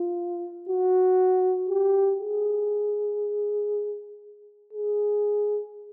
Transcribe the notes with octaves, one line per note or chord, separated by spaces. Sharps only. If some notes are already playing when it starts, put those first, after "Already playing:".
Already playing: F4
F#4
G4
G#4
G#4